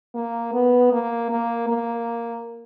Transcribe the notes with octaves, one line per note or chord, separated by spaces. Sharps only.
A#3
B3
A#3
A#3
A#3